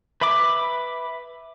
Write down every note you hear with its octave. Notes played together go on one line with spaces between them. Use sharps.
B4 E5 B5 D6